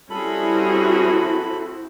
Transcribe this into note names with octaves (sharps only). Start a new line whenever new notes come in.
G3 C4 C#4 E4 F#4 G#4 A4 B5